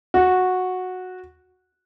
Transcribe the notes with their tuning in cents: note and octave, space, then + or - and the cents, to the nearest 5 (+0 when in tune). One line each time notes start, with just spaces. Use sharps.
F#4 -10